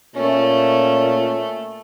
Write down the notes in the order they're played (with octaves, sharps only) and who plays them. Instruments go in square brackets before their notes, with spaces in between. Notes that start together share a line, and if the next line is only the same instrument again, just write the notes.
[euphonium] A#2 [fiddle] A3 [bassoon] C#4